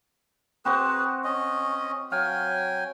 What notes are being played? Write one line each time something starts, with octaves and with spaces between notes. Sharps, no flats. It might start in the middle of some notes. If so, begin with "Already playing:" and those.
C4 F#4 G#4 B4 C5
C#4 D#5
F#3 F5 G5 G#5